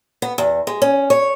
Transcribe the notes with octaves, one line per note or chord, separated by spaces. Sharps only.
B3
E2
G#3
C#4
C#5